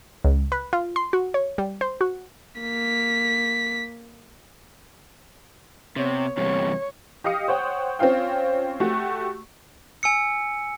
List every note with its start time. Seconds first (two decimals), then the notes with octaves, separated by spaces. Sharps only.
0.25 C#2
0.52 B4
0.73 F4
0.96 C6
1.13 F#4
1.34 C#5
1.58 G3
1.81 C5
2.01 F#4
2.61 A#3 B6
5.96 C3 B3 C#5
6.37 E2 G2 C3 C#5
7.24 G4 D#5 F5 D#6 C#7
7.48 C5 C#5 F#5 G5
7.99 C4 C#4 F4 F5 G5
8.80 A3 F#4 G4
10.03 G#5 E6 C#7